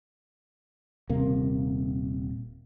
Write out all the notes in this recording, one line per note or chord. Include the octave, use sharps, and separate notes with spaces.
D#1 C3 A#3